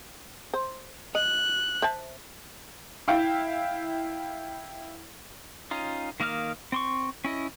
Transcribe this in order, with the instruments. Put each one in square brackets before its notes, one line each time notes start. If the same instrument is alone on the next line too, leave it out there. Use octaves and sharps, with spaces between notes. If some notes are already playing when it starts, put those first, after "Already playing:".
[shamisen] C5
[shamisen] D#5 [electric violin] F#6
[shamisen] C5 E5 A5
[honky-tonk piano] E4 F5 G5
[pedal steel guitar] C#4 D#4 F4
D#3 A#3 D#5 F5 F6
C4 C6 C#6
C#4 E4 D#5